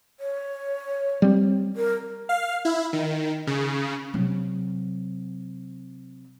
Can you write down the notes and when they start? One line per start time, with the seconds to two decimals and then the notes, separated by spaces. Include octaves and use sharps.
0.20 C#5
1.22 G3 C4
1.76 A#4
2.29 F5
2.65 E4
2.93 D#3
3.47 C#3
4.14 C3 F#3